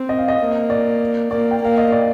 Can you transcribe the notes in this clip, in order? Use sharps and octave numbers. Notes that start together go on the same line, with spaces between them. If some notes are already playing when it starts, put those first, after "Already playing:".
Already playing: C4
D#5
F5
D#5
A#3
D5
A#3 D5
G5
A#3 F5
D#5
D5